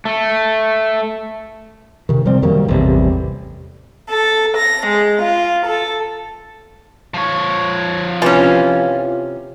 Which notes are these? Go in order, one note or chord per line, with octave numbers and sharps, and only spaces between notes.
A3
C3 D#3
C3 F3 G3 C4
F#2 D#3 G3 A#3
A1 E2 C3 G3
A4
A#6
G#3
F4
A4
F3 C#5
C3 E3 C#4 F4 A5